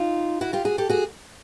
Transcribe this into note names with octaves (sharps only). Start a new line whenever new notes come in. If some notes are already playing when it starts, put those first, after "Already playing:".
Already playing: D#4 F4
E4 F#4
F4 G4
F#4 G#4
G4 A4
F#4 G#4